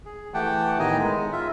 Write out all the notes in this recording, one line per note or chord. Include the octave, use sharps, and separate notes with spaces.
G#4
E3 A3 G4 F#5 G5 A5
A2 D#3 B3 D#5 G#5 A#5
G#3
F4 E5